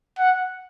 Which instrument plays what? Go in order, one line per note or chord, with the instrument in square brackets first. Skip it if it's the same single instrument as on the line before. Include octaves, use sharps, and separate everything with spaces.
[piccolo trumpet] F#5